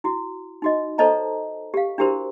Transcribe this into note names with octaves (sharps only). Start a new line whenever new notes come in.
E4 F#4
D#4 F#4 D#5
A4 C5 C#5 D#5 A5 A#5
G4 F5
D4 E4 F#4 G4 A#4 C5